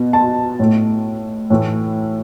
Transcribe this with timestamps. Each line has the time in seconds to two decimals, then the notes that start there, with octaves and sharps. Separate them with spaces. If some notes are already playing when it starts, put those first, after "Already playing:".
Already playing: B2 B3
0.13 A5
0.59 A2 A3
1.50 A2 E3 A3